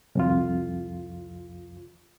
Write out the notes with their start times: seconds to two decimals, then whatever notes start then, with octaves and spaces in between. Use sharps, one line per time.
0.15 C2 F2 F4